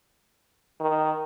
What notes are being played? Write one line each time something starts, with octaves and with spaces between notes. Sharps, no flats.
D#3